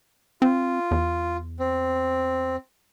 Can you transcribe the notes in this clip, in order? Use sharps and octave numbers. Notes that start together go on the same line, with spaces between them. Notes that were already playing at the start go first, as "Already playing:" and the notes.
C4 F4
E2
C4